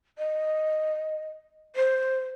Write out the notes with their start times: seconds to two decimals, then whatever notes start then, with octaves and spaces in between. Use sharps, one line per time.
0.18 D#5
1.76 C5